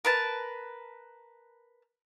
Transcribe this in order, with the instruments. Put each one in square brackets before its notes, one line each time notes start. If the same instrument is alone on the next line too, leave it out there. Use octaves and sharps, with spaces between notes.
[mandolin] A#4 B4 A5